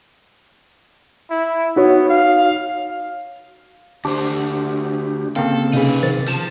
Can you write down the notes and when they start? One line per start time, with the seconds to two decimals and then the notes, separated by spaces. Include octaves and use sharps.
1.30 E4
1.76 B3 D#4 F#4 C#5
2.09 F5
4.05 D2 D4 G4 C5
5.36 C#3 A#3 C4 A4 F5
5.73 C3 C#4 D#4 G#4 B4
6.03 C3 D#3 F3 A6
6.28 F3 A5